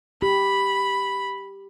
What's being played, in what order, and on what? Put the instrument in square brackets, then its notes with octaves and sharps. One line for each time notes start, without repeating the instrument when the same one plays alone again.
[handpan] G4 [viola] B5